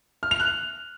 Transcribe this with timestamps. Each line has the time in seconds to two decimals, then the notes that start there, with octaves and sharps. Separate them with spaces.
0.23 F6
0.31 F7
0.40 F#6